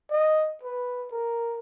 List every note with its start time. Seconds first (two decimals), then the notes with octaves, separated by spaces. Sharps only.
0.11 D#5
0.63 B4
1.11 A#4